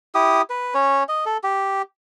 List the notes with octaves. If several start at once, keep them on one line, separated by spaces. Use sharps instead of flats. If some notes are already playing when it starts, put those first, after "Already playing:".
E4 G4 D#6
B4
C#4 C#5
D#5
A4
G4